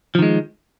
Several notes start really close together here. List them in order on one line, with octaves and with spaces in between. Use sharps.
F3 D#3 G#3